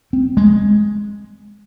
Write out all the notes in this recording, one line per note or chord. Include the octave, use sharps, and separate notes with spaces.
C4
G#3